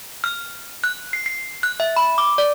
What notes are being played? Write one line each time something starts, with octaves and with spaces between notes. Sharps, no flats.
F6
F#6
C7
C7
F#6
E5
B5
D6
D5